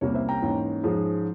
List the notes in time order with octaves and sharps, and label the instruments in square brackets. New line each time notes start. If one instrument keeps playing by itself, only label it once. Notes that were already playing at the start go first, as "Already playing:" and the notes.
[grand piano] C2 C3 G3 A#3 C#4 C#5
C5 E5
G5 A#5
G#2 E3 A#3 C#4
G#2 F3 G#3 C#4